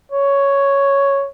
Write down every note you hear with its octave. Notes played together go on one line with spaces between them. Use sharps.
C#5